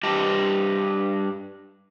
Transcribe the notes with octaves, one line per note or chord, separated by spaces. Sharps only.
G2 G4 D#5 G5 A5